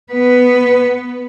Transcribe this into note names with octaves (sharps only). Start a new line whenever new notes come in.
B3 B4